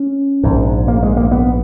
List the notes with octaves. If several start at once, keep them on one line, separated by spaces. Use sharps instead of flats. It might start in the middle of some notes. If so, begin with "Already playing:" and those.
Already playing: C#4
A#1 G#2
A#3
G#3
A#3
B3